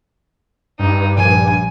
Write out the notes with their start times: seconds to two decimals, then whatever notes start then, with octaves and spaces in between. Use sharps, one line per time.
0.79 G2 D#4
1.17 A#1 G#5